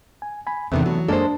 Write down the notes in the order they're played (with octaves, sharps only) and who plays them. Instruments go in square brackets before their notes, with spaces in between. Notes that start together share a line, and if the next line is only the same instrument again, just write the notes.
[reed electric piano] G#5
G#5 B5
[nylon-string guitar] E2 C3 D#3 [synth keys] A3 B3 D4 [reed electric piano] C4
[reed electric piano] E3 [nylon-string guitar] F#3
[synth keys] F#2 G#3 A#3 [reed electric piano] D4 A5 [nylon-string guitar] A4 C5